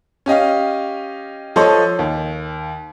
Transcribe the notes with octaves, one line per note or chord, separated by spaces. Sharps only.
C#4 G4 D#5 F5
F3 A4 C#5 D#5 C6
D#2